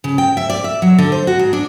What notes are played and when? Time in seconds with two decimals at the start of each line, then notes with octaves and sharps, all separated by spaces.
0.04 C#3
0.18 G5
0.37 E5
0.50 D5
0.64 E5
0.82 F#3
0.98 D3
1.12 C5
1.27 F#4
1.39 G#2
1.53 D4